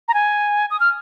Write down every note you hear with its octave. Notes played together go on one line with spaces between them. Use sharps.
A#5
G#5
D#6
F6